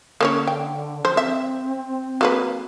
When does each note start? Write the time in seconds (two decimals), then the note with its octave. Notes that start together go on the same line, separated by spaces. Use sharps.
0.21 D3 A#3 C#4 C#5
0.47 G5
1.05 F3 C5
1.17 C4 E5
2.21 F#3 A#3 B4